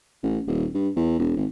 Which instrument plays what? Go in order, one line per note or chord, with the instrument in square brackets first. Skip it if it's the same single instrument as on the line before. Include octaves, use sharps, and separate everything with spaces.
[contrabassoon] A1
D#1
G2
E2
E1
G#1